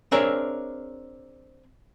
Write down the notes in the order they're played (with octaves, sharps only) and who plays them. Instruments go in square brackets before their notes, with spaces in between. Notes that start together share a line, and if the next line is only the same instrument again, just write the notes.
[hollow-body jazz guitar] C4 D4 G#4 A#4 C#5 E5